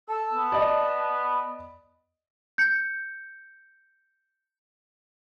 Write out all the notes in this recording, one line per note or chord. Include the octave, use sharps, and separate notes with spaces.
A4 A5 E6
B3
D5 D#5 B5
G6 C#7